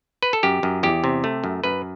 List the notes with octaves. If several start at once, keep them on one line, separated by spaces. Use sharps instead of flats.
B4
A4
F#2 G4
F#2
E2 G4
C3
A3
F#2
F#2 B4